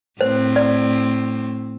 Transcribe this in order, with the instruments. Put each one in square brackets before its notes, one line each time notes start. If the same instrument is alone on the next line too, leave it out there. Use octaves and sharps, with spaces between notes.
[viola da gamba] A2 C4 [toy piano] C5
[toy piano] D5